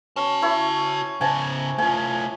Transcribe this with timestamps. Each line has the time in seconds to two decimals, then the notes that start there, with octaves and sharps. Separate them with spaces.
0.16 C#4 F#4 A5
0.42 E4 C#5
1.21 C#3 C5 G#5 A5
1.78 A3 F4 G#5